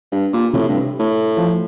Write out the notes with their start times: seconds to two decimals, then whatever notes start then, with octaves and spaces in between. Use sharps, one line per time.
0.12 G2
0.33 A#2
0.53 A2 C3
0.69 G2
1.00 A2
1.37 F3